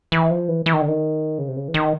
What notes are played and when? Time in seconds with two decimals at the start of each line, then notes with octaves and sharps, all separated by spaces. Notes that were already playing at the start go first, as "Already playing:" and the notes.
0.12 E3
0.31 F3
0.48 E3
0.66 E3
0.73 D#3
0.81 D3
0.88 D#3
1.38 C#3
1.48 C3
1.56 C#3
1.68 E3
1.74 D#3